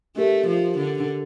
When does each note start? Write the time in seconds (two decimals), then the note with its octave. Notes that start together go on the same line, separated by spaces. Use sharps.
0.16 A3 D4 G4 A#4
0.47 F3
0.78 D3